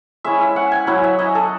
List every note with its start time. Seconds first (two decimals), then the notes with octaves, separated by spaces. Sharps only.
0.24 G#3 C#4 E4 E5
0.40 E5
0.56 F#5
0.72 G#5
0.87 F#3 C#4 E4 F#5
1.04 E5
1.19 D#5
1.35 A4